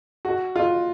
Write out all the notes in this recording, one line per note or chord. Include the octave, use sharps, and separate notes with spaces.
F#4
F4